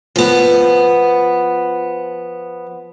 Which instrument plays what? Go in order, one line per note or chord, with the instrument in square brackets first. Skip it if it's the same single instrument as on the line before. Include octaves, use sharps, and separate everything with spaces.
[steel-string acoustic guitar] F3 B3